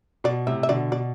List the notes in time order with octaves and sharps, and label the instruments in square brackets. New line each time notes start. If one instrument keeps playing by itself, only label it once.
[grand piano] B2 [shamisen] D5
[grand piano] A2 C3 [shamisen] E5
[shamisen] E5
[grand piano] B2 D3 [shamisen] D5
[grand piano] B2 [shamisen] D5